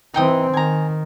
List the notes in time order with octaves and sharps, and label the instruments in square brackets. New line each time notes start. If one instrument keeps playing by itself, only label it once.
[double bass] E3 C4 [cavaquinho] D#4 G5 D#6
[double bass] D#3 [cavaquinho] G#5 A#5